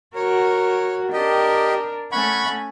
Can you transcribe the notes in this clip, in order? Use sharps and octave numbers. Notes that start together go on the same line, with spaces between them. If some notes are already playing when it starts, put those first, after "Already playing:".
F#4 A#4 C#5
D4 G4 A#4 D#5 G5
A3 C#4 F#5 B5 C#6